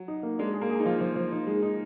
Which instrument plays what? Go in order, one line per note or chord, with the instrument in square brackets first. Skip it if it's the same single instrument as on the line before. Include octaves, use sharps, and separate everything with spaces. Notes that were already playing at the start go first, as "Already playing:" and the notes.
Already playing: [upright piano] F#3
[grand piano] D#4
A#3
[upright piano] G#3 [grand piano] D4
[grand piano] G#4
[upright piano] A#3
[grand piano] G#4
[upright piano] D#4
[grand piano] F3 [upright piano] F4
[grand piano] F3
F3
D#4
G#3
D#4